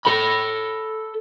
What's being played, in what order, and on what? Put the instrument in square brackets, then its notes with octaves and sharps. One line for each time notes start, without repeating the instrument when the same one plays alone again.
[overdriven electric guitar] A4 B5